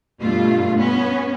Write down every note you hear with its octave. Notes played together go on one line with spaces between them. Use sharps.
G2 B2 A3 F4
B3 C#4